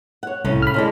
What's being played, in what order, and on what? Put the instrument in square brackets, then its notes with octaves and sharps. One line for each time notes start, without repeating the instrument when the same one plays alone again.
[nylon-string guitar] C#5 F#5
[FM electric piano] C2 [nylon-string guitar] A2 C#3 C#4
[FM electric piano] B5 F6
[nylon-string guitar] A#2 D3 G#3